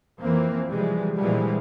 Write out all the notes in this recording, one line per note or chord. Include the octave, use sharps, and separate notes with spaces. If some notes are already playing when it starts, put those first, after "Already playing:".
F2 E3 A#3 C4
C3 E3 F3 G3 G#3
A#2 D3 E3 F3 G3 G#3